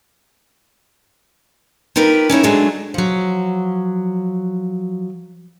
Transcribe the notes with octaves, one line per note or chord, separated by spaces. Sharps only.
D#4 F4 G4 A#4 B4
C#4 D#4 E4 C#5
F#3 G#3 A3 D4 F#4
F3 F#3